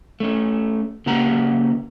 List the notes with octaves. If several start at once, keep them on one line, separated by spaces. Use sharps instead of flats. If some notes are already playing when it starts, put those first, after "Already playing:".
A3 C#4
C#3 A#3 E4 G4 F#5 A#5